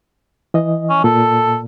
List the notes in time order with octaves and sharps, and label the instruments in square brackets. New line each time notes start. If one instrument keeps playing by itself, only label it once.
[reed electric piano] E3 D#5
[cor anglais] C#4
[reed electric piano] A#2 [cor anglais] A4